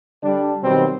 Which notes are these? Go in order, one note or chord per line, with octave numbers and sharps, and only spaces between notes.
D3 G3 D4
B2 D#3 F#3 G3 C4